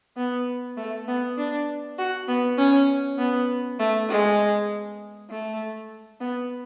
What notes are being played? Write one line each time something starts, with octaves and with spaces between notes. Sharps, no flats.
B3
A3
B3
D4
F#4
B3
C#4
B3
A3
G#3
A3
B3